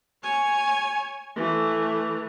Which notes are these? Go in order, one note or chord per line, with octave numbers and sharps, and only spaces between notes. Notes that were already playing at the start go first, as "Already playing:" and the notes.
C#5 G#5
E3 A3